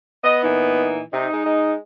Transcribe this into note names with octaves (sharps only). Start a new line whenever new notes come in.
B3 D#5
A#2 E3 D#4
C3 D#4
G#3
G#3